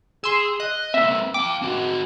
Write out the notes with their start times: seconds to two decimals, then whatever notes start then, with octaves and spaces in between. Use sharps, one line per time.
0.24 G#4 C6 E6
0.60 D#5 F#6
0.94 A#3 C4 E5
1.34 F5 G5 D6
1.62 C4 F#4